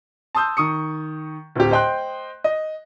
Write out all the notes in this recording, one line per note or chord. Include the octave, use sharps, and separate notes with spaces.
A5 C6 D#6 E6 G6
D#3 C#6 D#6 C#7
D1 C4 G4
C5 D#5 G5 C6 F#6
D#5